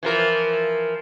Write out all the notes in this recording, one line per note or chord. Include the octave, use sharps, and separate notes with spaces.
E3 F3 A#4